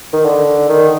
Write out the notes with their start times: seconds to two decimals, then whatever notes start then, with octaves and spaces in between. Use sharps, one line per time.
0.13 D#3
0.25 D3
0.69 D#3